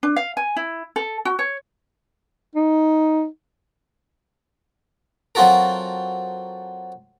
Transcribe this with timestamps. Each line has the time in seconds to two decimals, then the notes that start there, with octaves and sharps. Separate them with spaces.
0.03 D4
0.16 F5
0.37 G#5
0.56 E4
0.96 A4
1.25 F#4
1.39 C#5
2.55 D#4
5.35 F#3 C4 F4 F#4 A4 A#4